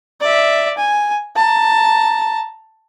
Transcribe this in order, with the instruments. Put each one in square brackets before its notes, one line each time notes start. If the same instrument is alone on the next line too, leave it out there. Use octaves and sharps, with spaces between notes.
[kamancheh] D5 E5
G#5
A5 A#5